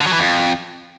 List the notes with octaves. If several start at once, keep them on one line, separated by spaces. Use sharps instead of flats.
D3
F#3
E3
F2